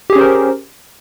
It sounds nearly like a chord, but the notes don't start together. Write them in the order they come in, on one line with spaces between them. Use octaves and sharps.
G4 G#4 C#4 C5 A#4